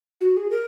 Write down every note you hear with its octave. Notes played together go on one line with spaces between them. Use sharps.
F#4
G#4
A#4